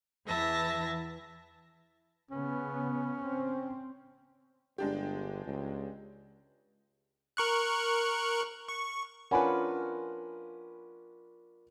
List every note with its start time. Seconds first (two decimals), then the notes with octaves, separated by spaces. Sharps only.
0.25 E2 E3 E4 E5 A5 A#6
2.31 C#3 B3 C#4
3.23 C4
4.78 G1 G#3 D4 G4
5.46 C#2
7.37 A#4 C#6 F#6
8.69 C#6
9.31 C#4 D4 F4 A#4 B4 F#5 G#5 B5